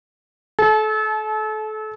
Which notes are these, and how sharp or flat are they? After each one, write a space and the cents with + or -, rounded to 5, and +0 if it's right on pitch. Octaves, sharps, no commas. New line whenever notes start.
A4 -30 A5 -40